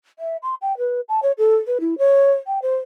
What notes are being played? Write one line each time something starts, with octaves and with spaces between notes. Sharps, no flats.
E5
C6
G5
B4
A5
C#5
A4
B4
E4
C#5
G5
C5